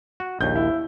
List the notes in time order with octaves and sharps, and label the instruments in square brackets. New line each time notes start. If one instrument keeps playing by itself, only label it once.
[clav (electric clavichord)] F#4
[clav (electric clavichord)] A#1 D#2 [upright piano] G6
[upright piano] E4